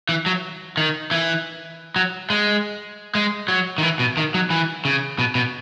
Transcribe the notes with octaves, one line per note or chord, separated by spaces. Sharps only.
E3
F#3
D#3
E3
F#3
G#3
G#3
F#3
D#3
E3
B2
D#3
F#3
E3
C#3
B2
B2